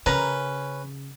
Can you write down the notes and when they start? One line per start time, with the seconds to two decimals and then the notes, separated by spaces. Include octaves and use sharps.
0.06 C#3 C#4 A#4 B4 A#5